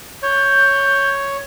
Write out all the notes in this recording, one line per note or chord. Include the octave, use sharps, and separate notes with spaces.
C#5 G6